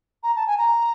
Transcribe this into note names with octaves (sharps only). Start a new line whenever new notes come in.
A#5
A5
G#5
A#5